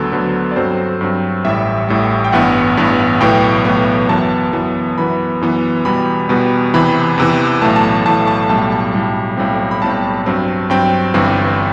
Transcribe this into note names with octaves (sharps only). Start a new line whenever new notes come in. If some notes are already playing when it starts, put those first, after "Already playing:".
Already playing: D2 D3 F#3 B3 A4
D2 D3 F#3 B3
D5
G2 F#3 C4 C5
G2 F#3 C4
A1 A2 G3 E5
A1 A2 G3
G5
A1 G2 E3 B3 F#5
A1 G2 E3 B3
B1 A2 E3 B3 G5
B1 A2 E3 B3
F#2 E3 B3 A5
F#2 E3 B3
F#2 E3 B3 B5
F#2 E3 B3
E2 B2 G3 B3 B5
E2 B2 G3 B3
E2 C3 E3 B5
E2 C3 E3
B1 A2 E3 A3 A5
A5
B1 A2 E3 A3 A5
A5
B1 A2 G3 A5
A5
B1 A2 G3
B1 A2 G3 C4
B5
B1 A2 G3 C4 A5
G2 F#3 C4
G2 F#3 C4 G5
G1 G2 E3 G3 C4